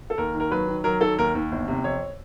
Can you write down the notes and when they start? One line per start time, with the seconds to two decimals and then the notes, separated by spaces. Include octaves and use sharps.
0.10 A4
0.18 D#2 A#4
0.35 D#3
0.40 A#4
0.51 F#3 B4
0.68 D#3
0.84 F#3 A#4
1.01 D#3 A4
1.18 D#2 A#4
1.35 D#2
1.51 G1
1.68 C3
1.84 F2 C#5